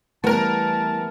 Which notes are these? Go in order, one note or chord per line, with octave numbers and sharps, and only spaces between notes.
E3 G3 A3 B3 A#4 A5